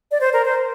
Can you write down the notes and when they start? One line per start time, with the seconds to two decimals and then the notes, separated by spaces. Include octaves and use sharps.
0.11 D5
0.21 C5
0.33 A#4
0.45 C5